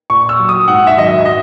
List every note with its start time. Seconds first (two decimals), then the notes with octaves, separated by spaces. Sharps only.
0.10 A#2 C#6
0.29 E6
0.39 F#3
0.49 D#6
0.68 G#2 F#5
0.87 E5
0.97 D#3 F#3 D#5
1.06 E5
1.20 E5
1.25 D#5